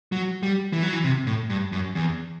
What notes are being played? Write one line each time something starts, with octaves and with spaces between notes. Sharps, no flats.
F#3
G3
E3
F#3
E3
C3
A2
G2
F#2
E2